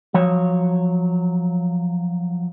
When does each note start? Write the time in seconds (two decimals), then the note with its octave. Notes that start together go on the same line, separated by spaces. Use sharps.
0.14 F3 F#3 C#5